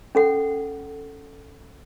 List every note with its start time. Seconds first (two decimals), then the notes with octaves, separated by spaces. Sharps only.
0.15 C#4 A4 F#5